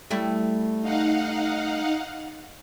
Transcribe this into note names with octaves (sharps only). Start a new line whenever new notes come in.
G3 A3 E4
D#4 F5 F#5